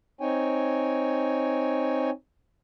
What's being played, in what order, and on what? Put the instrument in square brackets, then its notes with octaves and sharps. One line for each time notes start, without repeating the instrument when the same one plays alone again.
[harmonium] C4 D#4 C#5 G5 G#5